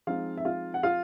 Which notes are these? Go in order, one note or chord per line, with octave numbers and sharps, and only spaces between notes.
F3 G#3 C4 D#4 F4 F5
E5
F4 F5
F#5
F4 F5